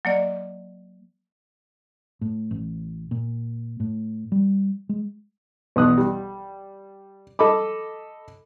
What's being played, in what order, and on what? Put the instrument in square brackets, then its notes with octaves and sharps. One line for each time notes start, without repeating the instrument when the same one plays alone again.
[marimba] F#3 A#3 D5 D#5
[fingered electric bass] A2
A1
A#2
A2
G3
G#3
[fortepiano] B1 E2 D#6 F#6
G3
A4 D#5 B5 D6